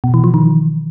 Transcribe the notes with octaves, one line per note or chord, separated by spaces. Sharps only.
B2
E3
F3
D#3